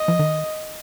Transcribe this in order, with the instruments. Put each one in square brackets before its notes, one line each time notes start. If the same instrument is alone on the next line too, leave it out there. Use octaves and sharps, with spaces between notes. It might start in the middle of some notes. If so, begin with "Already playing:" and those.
Already playing: [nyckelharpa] D#5
[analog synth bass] F3
D#3